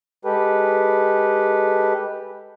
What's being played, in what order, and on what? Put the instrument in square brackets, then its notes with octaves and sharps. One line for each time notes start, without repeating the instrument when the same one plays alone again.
[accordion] G#3 G4 A4 B4